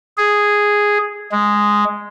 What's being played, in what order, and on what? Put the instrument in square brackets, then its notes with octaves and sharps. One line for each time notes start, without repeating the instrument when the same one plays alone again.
[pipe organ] G#4
G#3